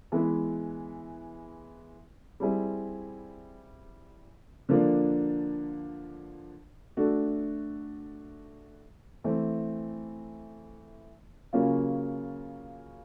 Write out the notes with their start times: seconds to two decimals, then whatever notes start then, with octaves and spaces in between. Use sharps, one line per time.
0.12 E3 G#3 B3 E4
2.40 G3 C4 E4 G#4
4.69 D3 F3 A#3 D4
6.97 A3 D4 F#4 A4
9.24 E3 A3 C4
11.53 C#3 F#3 A#3 C#4 F4